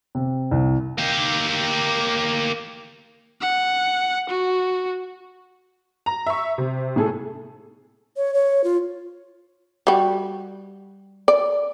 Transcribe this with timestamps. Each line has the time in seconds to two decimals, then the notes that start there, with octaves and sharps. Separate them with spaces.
0.15 C3
0.51 C2
0.98 A#3 G4
3.41 F#5
4.30 F#4
6.06 A#5
6.27 E5 C#6
6.58 C3
6.96 A2 G#4 A4
8.17 C#5
8.34 C#5
8.64 F4
9.87 G3 F#4
11.28 D5